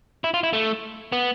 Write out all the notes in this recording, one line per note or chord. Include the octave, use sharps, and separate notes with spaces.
E4
F4
E4
A3
B3